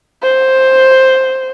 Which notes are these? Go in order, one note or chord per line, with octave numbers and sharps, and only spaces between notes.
C5